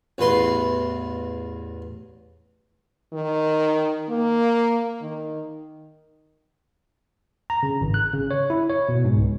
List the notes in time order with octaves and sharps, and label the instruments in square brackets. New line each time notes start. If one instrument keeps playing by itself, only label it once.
[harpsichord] A1 E2 B4 C6
[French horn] D#3
A#3
D#3
[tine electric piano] A#5
C#3
G#1
F#6
C#3
C#5
E4
C#5
B2
G#2
C#2